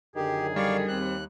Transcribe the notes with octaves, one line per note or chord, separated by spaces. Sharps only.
F#2 D3 D#3 G4 G#4
G3 D5 F5 C#6
D#2 C4 F#6